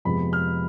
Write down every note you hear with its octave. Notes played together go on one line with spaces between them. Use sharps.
F2 C3 F3 G#3 B3 B5
F6